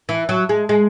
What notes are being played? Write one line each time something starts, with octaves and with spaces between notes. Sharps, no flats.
E3
F#3
G#3
G#3